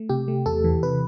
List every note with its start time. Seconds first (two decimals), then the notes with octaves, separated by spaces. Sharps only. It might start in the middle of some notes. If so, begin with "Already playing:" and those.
Already playing: A3
0.09 C3 G4
0.28 A3
0.46 E2 A4
0.64 E3
0.83 C3 B4